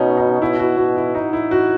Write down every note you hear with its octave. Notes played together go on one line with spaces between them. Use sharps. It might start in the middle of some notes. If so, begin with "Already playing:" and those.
Already playing: B2 C#4 D#4
D#4
B2 E4
F#4
B2 F#4
E4
D#4
E4
F#4